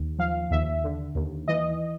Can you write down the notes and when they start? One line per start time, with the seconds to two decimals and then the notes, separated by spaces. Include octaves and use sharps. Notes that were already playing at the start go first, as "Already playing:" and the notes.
Already playing: D#2
0.18 F3 F5
0.51 D#2 E5
0.84 D3
1.15 D#2
1.48 E3 D#5